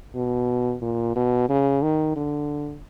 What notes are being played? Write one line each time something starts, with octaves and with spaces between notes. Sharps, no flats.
B2
A#2
B2
C#3
D#3
D3